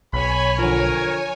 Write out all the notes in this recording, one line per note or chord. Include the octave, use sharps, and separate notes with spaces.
B1 C#5 G#5 B5
D3 F3 A#4